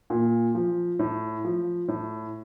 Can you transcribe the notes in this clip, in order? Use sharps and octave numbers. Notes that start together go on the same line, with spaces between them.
A#2
F3
A2
F3
A2